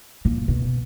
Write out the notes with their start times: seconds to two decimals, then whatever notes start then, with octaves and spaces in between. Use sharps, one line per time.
0.25 A#2
0.48 B2